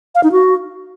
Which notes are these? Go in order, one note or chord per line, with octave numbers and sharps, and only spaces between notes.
F5
D#4
F#4